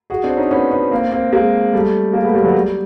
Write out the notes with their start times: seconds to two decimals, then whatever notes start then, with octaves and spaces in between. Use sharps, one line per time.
0.10 F#4 G#4
0.24 C4 D4
0.37 C#4 D#4
0.51 B3 C#4
0.71 B3 C#4
0.91 A#3 C4
1.11 A#3 C4
1.32 G#3 A#3
1.73 G3 A3
2.13 G#3 A#3
2.23 A3 B3
2.34 G3 A3
2.44 F#3 G#3
2.55 G3